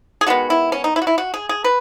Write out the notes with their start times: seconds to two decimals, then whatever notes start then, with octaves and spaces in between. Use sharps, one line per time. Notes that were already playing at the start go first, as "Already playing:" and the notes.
0.21 G#4
0.27 D#3 G#3 B3 F#4
0.50 E4
0.72 C#4
0.84 D#4
0.96 E4
1.02 F#4
1.07 E4
1.18 F#4
1.34 G#4
1.49 G#4
1.64 B4